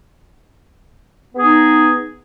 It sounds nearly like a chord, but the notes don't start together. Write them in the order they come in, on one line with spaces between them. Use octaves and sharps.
B3 G#4 D#4